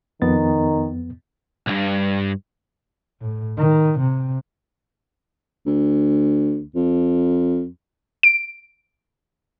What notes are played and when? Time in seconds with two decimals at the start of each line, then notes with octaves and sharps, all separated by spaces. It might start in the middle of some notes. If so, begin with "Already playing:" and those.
0.22 F2 D#3 B3 A6
1.67 B1 G2
3.21 A2
3.57 D#3
4.00 C3
5.67 D2
6.75 F2
8.23 D7